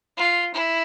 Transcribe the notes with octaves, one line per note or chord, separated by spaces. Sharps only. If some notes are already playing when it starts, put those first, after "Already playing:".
F4
E4